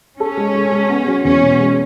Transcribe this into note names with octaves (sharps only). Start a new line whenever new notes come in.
C#4 A4
G#3
G#3
G#3
B3
F#3
E2 C#4
B2
G#3